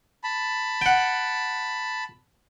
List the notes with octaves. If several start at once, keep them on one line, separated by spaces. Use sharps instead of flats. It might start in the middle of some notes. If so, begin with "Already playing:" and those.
A5 B5
F#5 G5